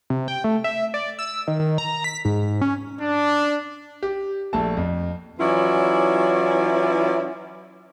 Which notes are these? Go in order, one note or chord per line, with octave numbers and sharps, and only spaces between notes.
C3
G5
A3
E5
D5
E6
D#3
D#3
A#5
B6
G#2
C#4
D4
G4
A#1 A3 A5
F2
E3 F#3 C#4 E4 F4 D5